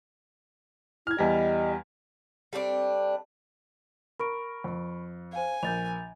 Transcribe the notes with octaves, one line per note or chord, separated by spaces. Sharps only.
E4 F6 G#6
E2 G3 D#5
G3 A3 C4 D4
A#4 B5 C#6 D7
F2
C5 F5 G#5
A#1 G6 A6 F7